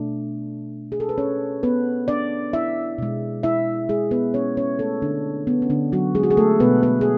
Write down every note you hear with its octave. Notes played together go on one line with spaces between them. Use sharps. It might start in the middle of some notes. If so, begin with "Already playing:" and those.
Already playing: B2 A3 D4
G#4
A4
B4
C#4 C#5
B3 B4
D4 D5
E4 E5
B2 G#3
E4 E5
G#3 G#4
B3 B4
C#4 C#5
C#4 C#5
A3 A4
D3 D4
B3
C#4
D3 D4
F#3 F#4
G#3 G#4
F#4
G#4
A3 A4
B2 G#3 B3 B4
B3 B4
G#4